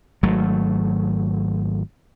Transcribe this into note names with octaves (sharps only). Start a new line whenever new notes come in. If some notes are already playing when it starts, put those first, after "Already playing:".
G#1 F#3 A3